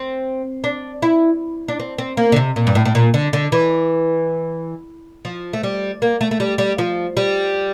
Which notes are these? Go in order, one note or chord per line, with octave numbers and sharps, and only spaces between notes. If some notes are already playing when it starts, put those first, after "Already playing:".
Already playing: C4
D4
E4
D4
C4
C4
A#3
D3
C3
A#2
G2
A2
A2
A#2
D3
D3
E3
F3
A3
G3
A#3
A3
A3
G3
G3
F3
G3